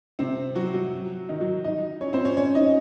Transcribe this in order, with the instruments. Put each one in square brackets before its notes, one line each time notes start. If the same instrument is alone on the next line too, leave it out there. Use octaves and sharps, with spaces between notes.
[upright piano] C3 C4
F#3 F#4
F#3 F#4
D#3 D#4
F#3 F#4
D#4 D#5
C#4 C#5
C4 C5
C#4 C#5
C#4 C#5
D#4 D#5